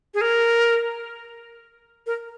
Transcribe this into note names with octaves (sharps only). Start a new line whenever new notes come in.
G#4
A#4
A#4